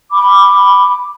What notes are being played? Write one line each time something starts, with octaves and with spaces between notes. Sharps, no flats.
B5 D6